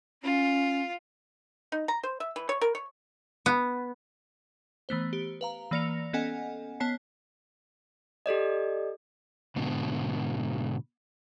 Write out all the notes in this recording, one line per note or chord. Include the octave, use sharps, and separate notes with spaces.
C#4 F4
D#4
A#5
C5
E5
E3
C#5
A#4
C#5
B3
E3 A3 B3 C5
G4
B4 F5 A#5
E3 A#3 D5 A#6 C#7 F7
B3 C#4 A4 D#5 F#5 G#5
B3 C#5 A5 C7
G4 A4 D5 D#5
G#2 B2 D3